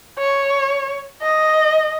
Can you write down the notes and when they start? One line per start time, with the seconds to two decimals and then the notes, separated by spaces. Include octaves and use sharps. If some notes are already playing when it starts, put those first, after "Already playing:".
0.18 C#5
1.21 D#5